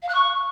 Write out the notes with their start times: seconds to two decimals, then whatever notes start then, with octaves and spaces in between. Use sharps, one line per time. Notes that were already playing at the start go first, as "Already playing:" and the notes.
0.02 F5
0.09 F#6
0.15 C#6